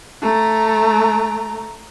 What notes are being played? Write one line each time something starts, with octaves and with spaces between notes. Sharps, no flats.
A3 A#5